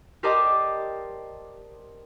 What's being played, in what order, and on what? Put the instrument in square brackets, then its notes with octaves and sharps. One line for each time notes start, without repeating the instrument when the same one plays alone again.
[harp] G4 A#4 C5 D5 D#5 A5